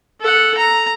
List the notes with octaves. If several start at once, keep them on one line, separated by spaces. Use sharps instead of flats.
A4 F#5
A#5